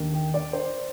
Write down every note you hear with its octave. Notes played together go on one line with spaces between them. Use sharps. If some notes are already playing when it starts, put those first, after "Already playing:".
Already playing: D#2 D#3 A#3 D4
G5
D5
C5